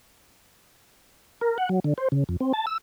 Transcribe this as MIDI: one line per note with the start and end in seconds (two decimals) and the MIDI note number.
1.41 1.58 70
1.58 1.69 78
1.69 1.80 54
1.84 1.93 50
1.98 2.08 72
2.12 2.24 49
2.29 2.37 41
2.41 2.53 60
2.53 2.66 81
2.67 2.78 88